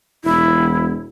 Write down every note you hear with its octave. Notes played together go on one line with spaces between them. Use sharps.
E1 E4